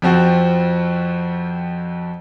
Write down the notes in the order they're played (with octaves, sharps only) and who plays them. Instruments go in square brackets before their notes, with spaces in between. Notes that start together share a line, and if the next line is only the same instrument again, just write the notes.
[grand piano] F2 F3 C4 F#4